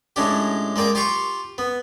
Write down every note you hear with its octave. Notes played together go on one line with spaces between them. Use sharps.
A2 G#3 C#4 D4 G4
G#3 A#3 D5 G5 D#6
F4 G4 F5 G5 C6 C#6
B3